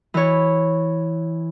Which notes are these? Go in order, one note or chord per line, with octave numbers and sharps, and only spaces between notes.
E3 C#5